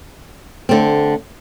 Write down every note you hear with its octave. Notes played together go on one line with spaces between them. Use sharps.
D3 A3 C4